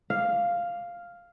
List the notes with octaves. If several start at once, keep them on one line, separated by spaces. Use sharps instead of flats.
F5